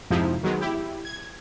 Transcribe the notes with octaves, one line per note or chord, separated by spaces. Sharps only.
F2 G#2 C3 F3 D#4 E4
D#3 F#3 G#3 B3
E4 G4
G#6